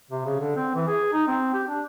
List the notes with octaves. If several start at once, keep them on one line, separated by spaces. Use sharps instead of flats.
C3
C#3
D3
C4
E3
G#4
D#4
C4
G4
D4